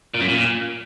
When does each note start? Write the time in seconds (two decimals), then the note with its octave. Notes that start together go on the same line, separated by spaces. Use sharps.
0.14 A#2
0.21 F#2
0.27 A#2